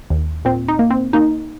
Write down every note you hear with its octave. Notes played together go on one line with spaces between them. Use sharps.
D#2
A#2 C4
D#4
A#3
C4
A#3 D#4